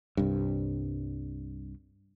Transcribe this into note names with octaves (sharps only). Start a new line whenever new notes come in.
C2 G2